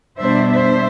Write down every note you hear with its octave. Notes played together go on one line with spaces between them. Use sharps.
B2 G3 B3 D4 C5 E5
C5 E5